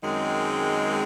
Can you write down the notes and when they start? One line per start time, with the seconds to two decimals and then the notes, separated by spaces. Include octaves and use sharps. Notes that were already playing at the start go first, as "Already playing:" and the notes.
0.01 F#2 D#3 G#3 C4